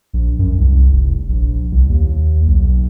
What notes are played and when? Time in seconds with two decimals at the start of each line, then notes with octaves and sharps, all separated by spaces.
0.14 A#1
0.39 F#2
0.58 C2
0.92 F1
1.29 A#1
1.72 C2
1.90 D#2
2.47 B1